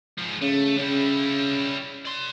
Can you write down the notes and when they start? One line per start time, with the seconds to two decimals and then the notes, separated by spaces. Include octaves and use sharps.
0.18 G#2 F3
0.41 C#3 A3
0.78 C#3 G3 E4
2.06 D5 C6